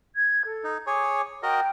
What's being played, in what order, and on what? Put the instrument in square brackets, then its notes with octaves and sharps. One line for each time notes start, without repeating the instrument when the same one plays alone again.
[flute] G#6
A4
[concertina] D#4
[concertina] G#4 C#5 [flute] D6
[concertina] F#4 A#4 D#5 [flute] G5